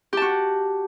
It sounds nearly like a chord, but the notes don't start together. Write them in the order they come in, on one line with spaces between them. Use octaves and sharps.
G4 A5 F#4